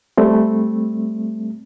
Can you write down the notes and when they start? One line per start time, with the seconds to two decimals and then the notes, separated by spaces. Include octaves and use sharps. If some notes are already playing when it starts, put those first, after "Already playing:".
0.17 G3 A3 C4